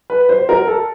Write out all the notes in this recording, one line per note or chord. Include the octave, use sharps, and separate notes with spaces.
B4
C5
A#4
A4